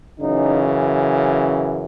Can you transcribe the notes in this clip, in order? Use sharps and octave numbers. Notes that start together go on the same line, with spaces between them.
F#2 C#3 E3 D#4